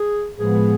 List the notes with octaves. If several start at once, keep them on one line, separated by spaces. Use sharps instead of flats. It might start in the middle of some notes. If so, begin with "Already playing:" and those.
Already playing: G#4
A2 F3 G#3 B3 G#4